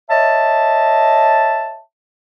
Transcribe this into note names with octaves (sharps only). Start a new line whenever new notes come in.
C#5 D#5 E5 A5